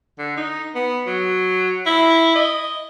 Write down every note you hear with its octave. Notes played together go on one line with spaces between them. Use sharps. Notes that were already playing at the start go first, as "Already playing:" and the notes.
D3
D#4
B3
F#3
E4
D#5